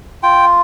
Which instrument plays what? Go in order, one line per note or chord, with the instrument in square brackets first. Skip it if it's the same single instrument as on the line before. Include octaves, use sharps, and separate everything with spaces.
[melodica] F4 G5